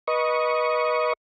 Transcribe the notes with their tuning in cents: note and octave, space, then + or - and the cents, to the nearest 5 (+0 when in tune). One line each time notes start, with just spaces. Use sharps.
B4 -25 D#5 +0 C#6 +0